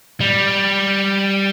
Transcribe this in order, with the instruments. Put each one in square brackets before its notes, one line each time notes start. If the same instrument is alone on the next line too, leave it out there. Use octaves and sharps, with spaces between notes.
[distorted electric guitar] G3